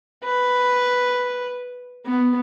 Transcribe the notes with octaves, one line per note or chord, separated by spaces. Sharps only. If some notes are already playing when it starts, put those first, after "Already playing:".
B4
B3